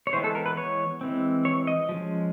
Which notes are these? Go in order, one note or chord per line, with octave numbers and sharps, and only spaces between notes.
C#5
E3 G#3 B3 C5
A4
A#4
B4
C#5
E3 G#3 C4
C#5
D#5
F3 G#3 C#4